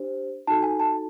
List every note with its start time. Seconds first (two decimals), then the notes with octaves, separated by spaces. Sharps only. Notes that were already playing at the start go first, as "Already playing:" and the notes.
Already playing: D4 G4 C5
0.47 D#4 F#4 A4 A5
0.63 G#5
0.80 A5